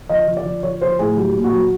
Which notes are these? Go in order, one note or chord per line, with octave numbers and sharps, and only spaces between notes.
F3 D#5
F3
D5
F3
F3 C#5
F3 C5
A2 G#4
F#3 G4
A#2
F#4
F#3